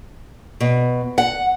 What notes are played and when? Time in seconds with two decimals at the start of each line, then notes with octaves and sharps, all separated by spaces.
0.60 B2
1.18 F#5